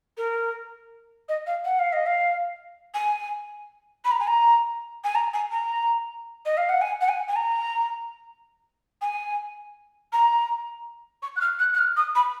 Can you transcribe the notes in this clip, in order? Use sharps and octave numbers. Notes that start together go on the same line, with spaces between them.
A#4
D#5
F5
F#5
F5
D#5
F5
G#5
B5
A#5
G#5
A#5
G#5
A#5
G#5
A#5
D#5
F5
F#5
G#5
F#5
G#5
G#5
A#5
G#5
A#5
C#6
F#6
F6
F#6
F#6
F6
D#6
B5